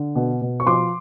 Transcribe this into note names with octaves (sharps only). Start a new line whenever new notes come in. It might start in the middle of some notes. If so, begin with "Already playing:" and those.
Already playing: D3
B2
B2
C#6
F3 C6 D6